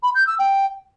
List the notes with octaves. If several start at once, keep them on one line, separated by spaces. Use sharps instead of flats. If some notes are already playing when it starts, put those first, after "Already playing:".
B5
G6
E6
G5